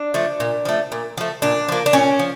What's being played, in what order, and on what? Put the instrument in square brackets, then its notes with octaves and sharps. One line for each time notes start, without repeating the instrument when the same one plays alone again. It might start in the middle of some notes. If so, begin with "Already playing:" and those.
Already playing: [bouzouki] D4
F3 A3
A#2
F3 A3
A#2
F3 A3
A#2 D4
F3 A#3
D4
A#2 C#4
F3